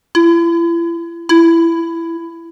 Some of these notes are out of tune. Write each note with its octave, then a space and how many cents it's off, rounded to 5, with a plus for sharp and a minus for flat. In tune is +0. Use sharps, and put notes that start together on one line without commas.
E4 +40
E4 +15